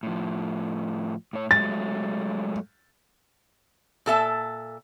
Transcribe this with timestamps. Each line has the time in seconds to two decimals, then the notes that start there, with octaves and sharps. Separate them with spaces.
0.03 A2 F3
1.33 A2 C#5
1.51 F#3 G#3 A3 A6
4.06 A#2 A4 E5 A5